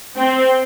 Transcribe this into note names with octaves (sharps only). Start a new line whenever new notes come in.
C4